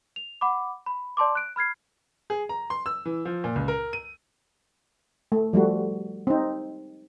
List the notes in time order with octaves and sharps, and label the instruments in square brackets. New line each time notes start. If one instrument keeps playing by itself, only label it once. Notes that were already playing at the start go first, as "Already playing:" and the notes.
[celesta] F7
F#5 B5 D6
B5
D5 A5 C6 D6
F#6 D7
B5 F6 G#6 C7
[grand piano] G#4
A#5
C6
E6
E3
F3
A#2
C#2
A#4
D#7
[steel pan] A3
F3 G3 A3 F#4
C4 D#4